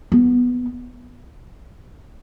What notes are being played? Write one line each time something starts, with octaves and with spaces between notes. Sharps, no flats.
B3